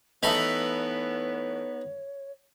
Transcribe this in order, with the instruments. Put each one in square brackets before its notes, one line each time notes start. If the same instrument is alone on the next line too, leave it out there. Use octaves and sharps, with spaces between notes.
[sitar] E3 A3 E5 [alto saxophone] B3 [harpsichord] D#4 B5 [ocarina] C#5